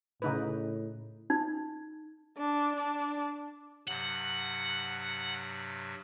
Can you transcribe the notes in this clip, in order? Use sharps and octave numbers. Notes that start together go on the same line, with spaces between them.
A2 C#3 D#4 B4
D#4
D4
D4
G2 C3 F#3 F#5